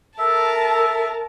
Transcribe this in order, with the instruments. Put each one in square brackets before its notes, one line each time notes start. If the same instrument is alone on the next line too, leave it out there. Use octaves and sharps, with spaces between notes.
[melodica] A4 E5 [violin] A#4 A5